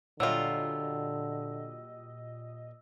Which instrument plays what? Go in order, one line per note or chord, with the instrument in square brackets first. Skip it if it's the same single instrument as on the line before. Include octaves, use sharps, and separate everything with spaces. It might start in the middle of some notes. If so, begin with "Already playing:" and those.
[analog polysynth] A#2 D#5 [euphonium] D3 [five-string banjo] F#3 G3 F4 [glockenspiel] E6